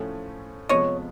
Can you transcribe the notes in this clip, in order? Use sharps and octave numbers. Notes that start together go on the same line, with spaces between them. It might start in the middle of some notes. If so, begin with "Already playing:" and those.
Already playing: A2 F3 A3 C#4
F2 C3 F3 G#3 B3 C#5 D#5